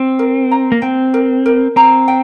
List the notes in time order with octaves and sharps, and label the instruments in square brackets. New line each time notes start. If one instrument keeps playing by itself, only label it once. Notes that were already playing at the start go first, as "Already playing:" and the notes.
Already playing: [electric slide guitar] C4
[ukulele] A#4
A#5
[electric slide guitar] A#3
[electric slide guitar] C4 [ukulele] G5
[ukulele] A#4
A#4
[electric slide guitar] C4 [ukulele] A#5
[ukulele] G5